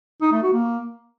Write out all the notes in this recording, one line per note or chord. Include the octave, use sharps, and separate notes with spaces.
D#4
A3
F#4
A#3